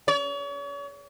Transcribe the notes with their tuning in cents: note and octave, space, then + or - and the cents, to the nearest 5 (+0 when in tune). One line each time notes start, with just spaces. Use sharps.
C#5 +40